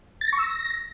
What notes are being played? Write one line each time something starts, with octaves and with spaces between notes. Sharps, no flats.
A6
A#6
C#6
E6
A#6